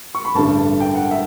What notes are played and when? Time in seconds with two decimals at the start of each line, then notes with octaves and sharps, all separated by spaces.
0.15 C#6
0.25 B5
0.34 A1 G2 D3 A3 A5
0.80 G5
0.95 F#5
1.11 E5